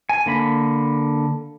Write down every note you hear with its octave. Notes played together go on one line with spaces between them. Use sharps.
G#5
D3 A#3 B5